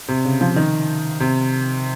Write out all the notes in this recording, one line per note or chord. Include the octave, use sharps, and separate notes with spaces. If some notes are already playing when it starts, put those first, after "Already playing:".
C3
C#3
F3
D#3
C3